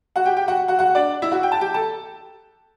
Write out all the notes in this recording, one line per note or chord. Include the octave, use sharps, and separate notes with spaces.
F#4 F#5
G4 G5
G4 G5
F#4 F#5
F#4 F#5
F#4 F#5
D4 D5
E4 E5
F#4 F#5
G5
A5
G4 G5
A4 A5